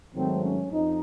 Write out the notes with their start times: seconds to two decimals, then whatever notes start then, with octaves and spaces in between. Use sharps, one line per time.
0.14 G#2 D#3 F#3 A3 C4
0.43 C#4
0.72 F2 D#4